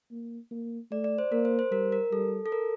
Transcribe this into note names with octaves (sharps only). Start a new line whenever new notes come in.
A#3
A#3
A3 D5
D5
C5
A#3 A#4
C5
C5
G3 A#4
A#4
G3 A4
A4
A#4